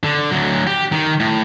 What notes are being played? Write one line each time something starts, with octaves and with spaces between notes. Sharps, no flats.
D3
D2 F#3
G4
D#3
A2